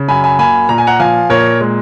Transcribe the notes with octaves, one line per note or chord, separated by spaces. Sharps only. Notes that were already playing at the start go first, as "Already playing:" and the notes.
Already playing: C#3
F#2 G#5 B5
G#5 B5
A#3 G#5 B5
A#2 A#5
G#5
F#5 A#5
F3 F5 G#5
A#2 A#4 C#5
G#3